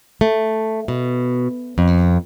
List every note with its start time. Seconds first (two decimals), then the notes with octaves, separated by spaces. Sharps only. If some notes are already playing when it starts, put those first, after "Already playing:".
0.21 A3
0.88 B2
1.78 F2